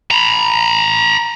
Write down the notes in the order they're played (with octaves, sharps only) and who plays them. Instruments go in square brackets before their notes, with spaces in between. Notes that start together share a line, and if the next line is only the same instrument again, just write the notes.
[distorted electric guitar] A#5 B5